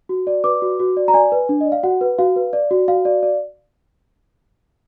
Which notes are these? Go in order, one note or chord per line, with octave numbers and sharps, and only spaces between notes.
F#4
D5
B4 D6
F#4
F#4
D5
A#5
D5 G#5
B4
D4
D#5
D5
F5
F#4 F#5
B4
F#4 F5
B4
D5
F#4
F#4 F5
D5
D5